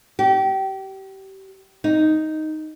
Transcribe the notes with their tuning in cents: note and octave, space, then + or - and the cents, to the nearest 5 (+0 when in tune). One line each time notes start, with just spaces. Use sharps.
G4 -30
D#4 +0